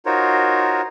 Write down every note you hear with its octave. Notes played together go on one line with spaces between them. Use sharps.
D#4 F4 F#4 A#4 C5 C#5